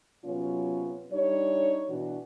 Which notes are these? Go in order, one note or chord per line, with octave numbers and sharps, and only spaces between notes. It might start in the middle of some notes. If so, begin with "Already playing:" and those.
C3 F#3 B3 C#4 F4 C#5
G3 D4 D#4 C#5
B2 E3 D4 F#4